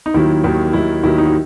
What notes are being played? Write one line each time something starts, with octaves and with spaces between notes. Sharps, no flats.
D#4
D#2 D#3 F#3 E4
D#2 D#3 F#3
D#2 D#3 F#3 E4
D#2 D#3 F#3 E4
D#4
F#4